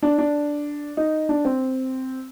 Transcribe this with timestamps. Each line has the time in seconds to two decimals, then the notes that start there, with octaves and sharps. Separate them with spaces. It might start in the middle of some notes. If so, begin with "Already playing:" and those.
0.03 D4
0.18 D4
0.97 D#4
1.29 D4
1.45 C4